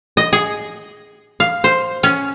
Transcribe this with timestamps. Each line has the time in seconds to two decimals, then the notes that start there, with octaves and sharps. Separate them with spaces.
0.17 D#5
0.33 G#4
1.40 F5
1.64 C5
2.03 C#4